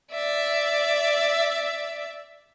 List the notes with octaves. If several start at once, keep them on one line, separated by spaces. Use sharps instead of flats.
D5 E5